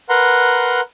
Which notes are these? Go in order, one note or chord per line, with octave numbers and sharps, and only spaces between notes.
A#4 B4 F#5 A#5 C6